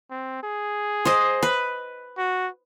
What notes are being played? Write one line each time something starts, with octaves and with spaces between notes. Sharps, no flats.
C4
G#4
C5 D#5
B4
F#4